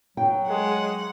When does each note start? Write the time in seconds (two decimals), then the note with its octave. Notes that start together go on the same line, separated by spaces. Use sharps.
0.17 F#3 G5
0.49 G#3 F#5